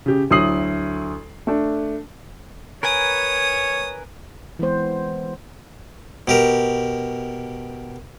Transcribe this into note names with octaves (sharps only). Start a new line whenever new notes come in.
C#3 G4
D2 F#3 E4 D#6 C7 F#7
A3 D4
A#4 B4 C#5 G#5 D#6
E3 G#3 B3 C5
B2 G4 A#4